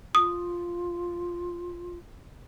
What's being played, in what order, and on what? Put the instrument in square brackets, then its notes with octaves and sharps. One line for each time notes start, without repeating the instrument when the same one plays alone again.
[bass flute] F4 [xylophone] D#6